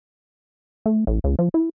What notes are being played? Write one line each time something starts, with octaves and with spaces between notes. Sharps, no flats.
A3
A1
C#2
F3
E4